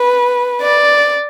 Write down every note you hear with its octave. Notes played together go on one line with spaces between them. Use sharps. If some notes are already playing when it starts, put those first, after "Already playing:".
Already playing: B4
D5